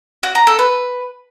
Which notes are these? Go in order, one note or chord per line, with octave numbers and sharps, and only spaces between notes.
F#4
A#5
A4
B4